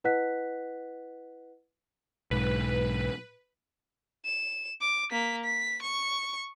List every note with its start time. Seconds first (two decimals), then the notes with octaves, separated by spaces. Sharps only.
0.04 E4 B4 D#5 F#5 F#6 B6
2.31 B1 G#2 B4
4.25 E7
4.81 D6
5.11 A#3 B6
5.44 B6
5.82 C#6